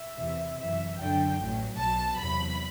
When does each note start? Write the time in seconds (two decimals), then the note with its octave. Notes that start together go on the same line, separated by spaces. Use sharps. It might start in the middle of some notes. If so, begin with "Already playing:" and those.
Already playing: E5
0.18 E2 C3 E3
0.58 F#2 E3 E5
0.99 F#2 D3 F#3 G5
1.39 A1 A2 F#3
1.79 B1 B2 F#3 A5
2.19 E2 C3 F#3 B5